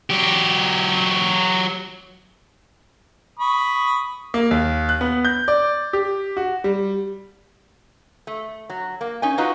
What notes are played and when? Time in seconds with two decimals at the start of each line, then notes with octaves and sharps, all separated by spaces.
0.10 F#3 G4
3.39 B5 C#6 D#6
4.34 A#3
4.51 D#2
4.89 F#6
5.01 B3
5.25 G6
5.48 D5
5.93 G4
6.37 F#4
6.64 G3
8.27 A3
8.70 F#3
9.01 A#3
9.22 C#4 D#4 G#5
9.38 D#4 F4 F#4 B4 D#5